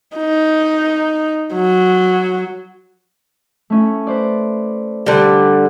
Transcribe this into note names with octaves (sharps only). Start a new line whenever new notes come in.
D#4
F#3
A3 C#4 E4
B4 C5 D5
D3 G3